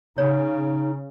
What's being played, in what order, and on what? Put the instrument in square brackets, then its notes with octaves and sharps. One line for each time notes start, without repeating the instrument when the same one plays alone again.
[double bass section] C#3 [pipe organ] D#4 [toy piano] C#5